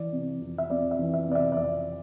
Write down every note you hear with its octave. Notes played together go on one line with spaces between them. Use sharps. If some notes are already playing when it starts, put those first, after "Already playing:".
Already playing: E3 D5
C3
F2
E5
F2 D5
E5
E3
E5
C3 D5
E5
D5
F2 E5